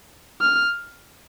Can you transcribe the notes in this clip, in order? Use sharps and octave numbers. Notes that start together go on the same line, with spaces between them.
F6